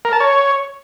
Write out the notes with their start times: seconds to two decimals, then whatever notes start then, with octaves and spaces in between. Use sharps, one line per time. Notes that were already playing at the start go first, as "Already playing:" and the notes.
0.05 A#4
0.13 A5
0.20 C#5